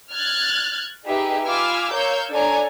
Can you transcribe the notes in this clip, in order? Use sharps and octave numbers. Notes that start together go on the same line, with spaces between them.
F6 F#6 G#6 A6
D#4 G4 G#4 B4 E5
F4 G#5 B5 D6 E6 F6
A#4 C#5 F5 E6 G6
D4 A4 C#5 G#5 A#5